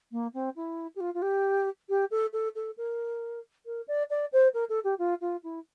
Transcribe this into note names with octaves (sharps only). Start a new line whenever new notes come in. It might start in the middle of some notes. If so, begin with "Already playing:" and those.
A#3
C4
E4
G4
F4
F4
G4
G4
A4
A4
A4
A#4
A#4
D5
D5
C5
A#4
A4
G4
F4
F4
E4